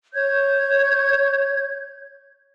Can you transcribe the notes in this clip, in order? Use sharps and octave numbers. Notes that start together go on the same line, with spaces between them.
C#5 G6 G#6